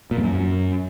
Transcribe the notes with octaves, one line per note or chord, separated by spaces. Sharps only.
A#2
F2
F#2